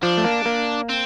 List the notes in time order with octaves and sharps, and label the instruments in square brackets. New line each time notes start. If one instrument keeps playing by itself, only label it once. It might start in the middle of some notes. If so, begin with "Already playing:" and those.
[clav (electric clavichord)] F3 [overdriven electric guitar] D4
[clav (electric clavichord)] A3
A#3
A#3
[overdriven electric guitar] C4